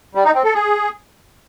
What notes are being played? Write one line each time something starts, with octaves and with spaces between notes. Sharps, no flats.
G3
D#4
C4
A4
G#4